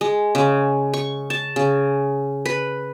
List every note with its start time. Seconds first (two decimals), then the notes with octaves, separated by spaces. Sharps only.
0.01 G#3
0.35 C#3
0.93 C#6
1.30 A5
1.56 C#3
2.45 B4